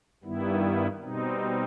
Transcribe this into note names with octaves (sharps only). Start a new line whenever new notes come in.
G2 D#3 G3 B3 E4
B2 G3 C4 D#4